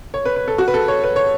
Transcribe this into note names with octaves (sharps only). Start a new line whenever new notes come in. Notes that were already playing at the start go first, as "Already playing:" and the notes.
C#5
B4
B4
A4
F#4
B4
A4
C#5
B4
C#5